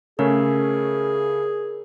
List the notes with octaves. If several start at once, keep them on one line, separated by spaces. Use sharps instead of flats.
C#3 A3 C#4 G#4 A#4